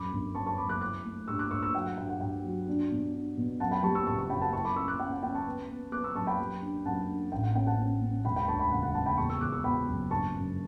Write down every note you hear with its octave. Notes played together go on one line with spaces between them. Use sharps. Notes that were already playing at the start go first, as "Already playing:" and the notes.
Already playing: F#2 B5 D6
G1
F#2 A5 C#6
A5 C#6
F#2 B5 D6
D6 F#6
E4 D6 F#6
A3
G2 C#6 E6
D6 F#6
G2 C#6 E6
C#6 E6
F#3 G5
F#5
G2 G5
F#5
G2 G5
F#3
D4
B2
D4
B2
F#2 F#5 A5
G5 B5
G3 A5 C#6
C#6 E6
F#1 A5 C#6
A5 C#6
F#2 G5 B5
F#5 A5
E4 A5 C#6
B5 D6
C#4 C#6 E6
D6 F#6
C#4 G5
F#5
C#4 G5
A5 C#6
B3
B3
B3 D6 F#6
C#6 E6
F#2 A5 C#6
G5 B5
G3
D4
F#2 F#5 A5
D4
A1 G5
F#5
C#4 G5
F#5 A5
C#4
C#4
E1 G5 B5
G5 B5
D2 A5 C#6
G5 B5
C#3 F#5
F#5
C#3 F#5 A5
G5 B5
E2 A5 C#6
C#6 E6
E2 D6 F#6
C#6 E6
B2 G5 B5
F#1
G1 A5 C#6
F#2